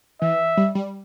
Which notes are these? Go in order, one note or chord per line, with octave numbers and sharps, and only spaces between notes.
E3 E5
G3
G3